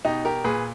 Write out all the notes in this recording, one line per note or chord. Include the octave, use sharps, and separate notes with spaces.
B2 D#4 G4
G4 A#4
A#2 G#4 B4